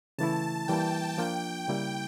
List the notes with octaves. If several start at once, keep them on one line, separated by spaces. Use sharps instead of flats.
C#3 E3 A3 E4 A5
E3 G3 A#3 G5
F3 A#3 D4 F4 G5
C#3 G3 A#3 E4